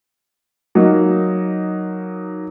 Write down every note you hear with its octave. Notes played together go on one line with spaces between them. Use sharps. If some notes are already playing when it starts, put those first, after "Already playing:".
F#3 A#3 D#4